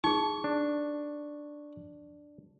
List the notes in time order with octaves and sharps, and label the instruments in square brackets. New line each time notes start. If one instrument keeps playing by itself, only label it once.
[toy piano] D#4 G#4 [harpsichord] C#6
[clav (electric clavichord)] D4